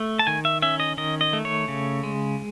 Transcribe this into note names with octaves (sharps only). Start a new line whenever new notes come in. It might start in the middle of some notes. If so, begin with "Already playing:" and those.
Already playing: A3
A5
D#3 G#5
E5
C#4 E5
D#5
D#3 D#5
D#5
A3
C#5
C#3
G#3